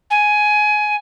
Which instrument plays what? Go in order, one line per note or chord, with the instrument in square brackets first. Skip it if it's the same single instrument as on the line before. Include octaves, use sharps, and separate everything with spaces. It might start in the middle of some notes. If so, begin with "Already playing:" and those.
[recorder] G#5